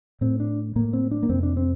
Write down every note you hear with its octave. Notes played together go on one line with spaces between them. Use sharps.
A2 C4
D4
A2 A#3
C4
D4
A#3
F2 C3 C4
D4
C4